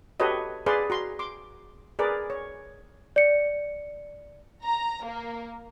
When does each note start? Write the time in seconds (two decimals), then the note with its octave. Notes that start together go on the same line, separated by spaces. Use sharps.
0.20 F#4 G4 A4 B4 C#5 D#5
0.66 G#4 B4 D5 F5 C6
0.90 F#4 A#5 C6
1.19 C6 D6
1.99 G#4 A#4 B4 D5
2.30 C#5
3.16 D5 C#7
4.64 A#5
5.05 A#3